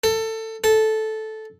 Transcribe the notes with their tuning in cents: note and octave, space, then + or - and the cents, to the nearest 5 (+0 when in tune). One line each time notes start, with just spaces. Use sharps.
A4 +20
A4 -10